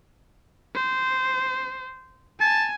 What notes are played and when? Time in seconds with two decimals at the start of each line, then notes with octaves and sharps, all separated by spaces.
0.75 C5
2.41 G#5 A5